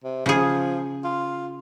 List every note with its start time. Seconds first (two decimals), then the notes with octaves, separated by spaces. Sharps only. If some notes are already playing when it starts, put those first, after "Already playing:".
0.04 C3
0.26 C#3 F3 G#4
1.04 F4